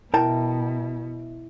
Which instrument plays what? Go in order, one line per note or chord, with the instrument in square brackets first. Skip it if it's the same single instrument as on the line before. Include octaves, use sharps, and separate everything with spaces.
[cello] B2 [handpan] E4 [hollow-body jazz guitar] A#4 G5 A5